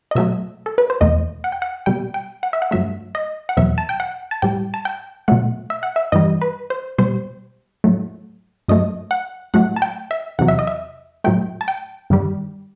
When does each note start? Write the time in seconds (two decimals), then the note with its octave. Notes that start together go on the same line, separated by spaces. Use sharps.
0.11 D#5
0.15 B2 F#3 A3 E5
0.66 A4
0.78 B4
0.90 C5
1.01 E2 B2 A3 D#5
1.44 F#5
1.52 G5
1.62 F#5
1.86 B2 G3 G5
2.14 G5
2.43 F#5
2.53 E5
2.62 F#5
2.71 G2 F#3 A3 E5
3.15 D#5
3.49 F#5
3.57 E2 B2 F#3 E5
3.78 A5
3.89 G5
4.00 F#5
4.31 A5
4.42 A2 G3 G5
4.74 A5
4.85 G5
5.28 B2 F#3 A3 F#5
5.70 E5
5.83 F#5
5.96 E5
6.12 G2 E3 G3 D#5
6.41 B4
6.70 C5
6.98 B2 G3 C5
7.84 A2 F#3 A3
8.68 G2 F#3 A3 D#5
9.11 F#5
9.54 A2 F#3 A3 F#5
9.76 A5
9.82 G5
10.11 E5
10.39 E2 C3 F#3 F#5
10.48 E5
10.59 D#5
10.67 E5
11.24 A2 F#3 A3 G5
11.61 A5
11.68 G5
12.10 G2 D#3 G3